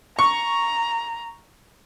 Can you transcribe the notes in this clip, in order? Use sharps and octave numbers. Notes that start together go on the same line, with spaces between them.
A#5 C#6